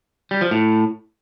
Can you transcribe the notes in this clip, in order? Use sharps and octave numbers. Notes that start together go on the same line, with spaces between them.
G3
F3
A2